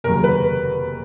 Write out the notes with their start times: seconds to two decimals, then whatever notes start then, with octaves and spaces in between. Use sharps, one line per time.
0.04 F1 D#2 C#3 F#3 A#4
0.24 B4